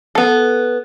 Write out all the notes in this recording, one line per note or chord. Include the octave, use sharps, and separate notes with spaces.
B3 A4